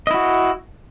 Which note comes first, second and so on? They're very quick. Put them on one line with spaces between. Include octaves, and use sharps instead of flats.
D#5 E4 F#4